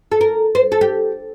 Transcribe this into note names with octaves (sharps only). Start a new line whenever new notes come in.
A4
A#4
C5
A4
G4